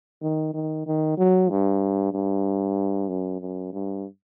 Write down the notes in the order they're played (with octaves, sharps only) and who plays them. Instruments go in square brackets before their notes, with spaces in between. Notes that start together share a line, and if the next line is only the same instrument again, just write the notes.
[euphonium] D#3
D#3
D#3
F#3
G2
G2
F#2
F#2
G2